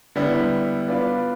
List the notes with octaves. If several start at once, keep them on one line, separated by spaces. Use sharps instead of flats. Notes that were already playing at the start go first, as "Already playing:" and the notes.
D3 G3 B3 E4
B3 D4 F4 B4 D5